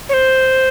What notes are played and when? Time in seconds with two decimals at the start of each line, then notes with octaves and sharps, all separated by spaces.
0.09 C#5
0.14 C5